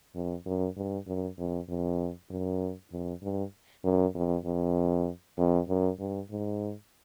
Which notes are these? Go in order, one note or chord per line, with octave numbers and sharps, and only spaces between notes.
F2
F#2
G2
F#2
F2
F2
F#2
F2
G2
F#2
F2
F2
F2
F#2
G2
G#2